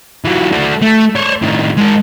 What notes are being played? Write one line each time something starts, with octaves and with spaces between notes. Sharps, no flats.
E3 F#3
A3 F#4
A3
C5 C#5
A2 D#3
G#3 A#4